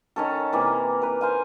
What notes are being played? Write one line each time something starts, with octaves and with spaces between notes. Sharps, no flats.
D#3 C#4 A4
C3 E3 A#3
A#4 B4
C5 F5 G#5